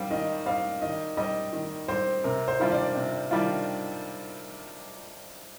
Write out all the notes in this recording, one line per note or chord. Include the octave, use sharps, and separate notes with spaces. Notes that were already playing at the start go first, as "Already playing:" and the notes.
Already playing: D#3 G3 C4 F5
D#3 D#5
G3 C4 F5
D#3 D#5
G3 C4 D#5
D#3
G3 C4 C5
C3 A#4
C5
D#3 G3 D4 F4
D5
C3
D#3 G3 D4 F4